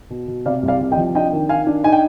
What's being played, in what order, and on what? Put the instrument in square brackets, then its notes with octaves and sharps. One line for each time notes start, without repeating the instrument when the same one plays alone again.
[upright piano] B2
B2
C3 D5 F5
C2
D5 F5
C3
D#5 G5
F3
D4 D#5 G5
D#3
D#3 F5 G#5
D4
D#4 G#5
G5